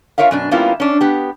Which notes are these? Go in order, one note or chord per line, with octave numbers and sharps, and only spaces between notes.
F4 A#4 C#5 E5 F5
F#2 B2 D4
G3 A#3 B3 C#4 E4 F4
C#4 D4
B3 G4